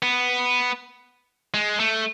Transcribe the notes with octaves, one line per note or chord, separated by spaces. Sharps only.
B3
G#3
A3